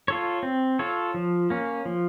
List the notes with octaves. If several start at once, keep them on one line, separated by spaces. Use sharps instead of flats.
F4 A4 C#5
C4
F4 A4 C#5
F3
A#3 C#4
F3